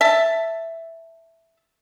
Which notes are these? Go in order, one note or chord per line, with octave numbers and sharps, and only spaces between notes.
E5 A5